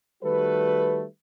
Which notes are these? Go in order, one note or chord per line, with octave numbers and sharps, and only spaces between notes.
D#3 G3 A3 F#4 A4 B4